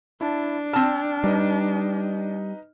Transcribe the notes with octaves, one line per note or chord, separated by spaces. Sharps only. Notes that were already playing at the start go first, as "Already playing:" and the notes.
D4 E4 A5
C4 A5 F6
G3 D#4 B4 D#5